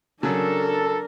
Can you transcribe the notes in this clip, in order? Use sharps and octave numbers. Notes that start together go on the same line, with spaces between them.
C#3 F#3 D4 A4 A#4